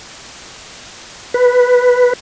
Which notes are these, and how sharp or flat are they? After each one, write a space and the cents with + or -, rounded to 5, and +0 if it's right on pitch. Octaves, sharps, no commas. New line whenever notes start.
B4 +0